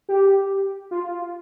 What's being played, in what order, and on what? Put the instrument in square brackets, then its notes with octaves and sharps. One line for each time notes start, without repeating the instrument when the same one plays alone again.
[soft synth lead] G4
F4